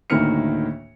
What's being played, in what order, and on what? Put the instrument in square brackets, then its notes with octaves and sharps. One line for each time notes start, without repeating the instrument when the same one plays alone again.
[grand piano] D2 A2 D#3 A#3 F6 C#7